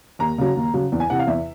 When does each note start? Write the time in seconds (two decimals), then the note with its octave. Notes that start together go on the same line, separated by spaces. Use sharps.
0.19 D#2 A#5
0.38 C#3 F#3
0.56 D#2
0.74 C#3 F#3
0.92 E2
1.00 G#5
1.10 C3 E3 F#5
1.19 F5
1.27 E2 E5